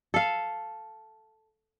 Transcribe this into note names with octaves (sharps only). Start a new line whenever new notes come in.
A4 F5